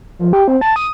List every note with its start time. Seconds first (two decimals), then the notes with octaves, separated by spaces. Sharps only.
0.19 F3
0.33 G4
0.48 C4
0.61 A5
0.76 D#6